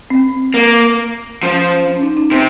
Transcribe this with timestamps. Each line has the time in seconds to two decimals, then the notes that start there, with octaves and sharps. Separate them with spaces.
0.10 C4
0.54 A#3
1.42 F3 C#4
1.88 C#4
2.02 D#4
2.17 D#4
2.31 C3 D#4